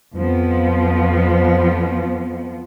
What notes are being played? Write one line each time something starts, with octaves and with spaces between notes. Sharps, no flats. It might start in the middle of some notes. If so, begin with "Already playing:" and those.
F2 F3 B3